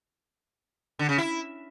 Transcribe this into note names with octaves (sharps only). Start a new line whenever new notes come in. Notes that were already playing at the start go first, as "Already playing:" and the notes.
D3
C#3
E4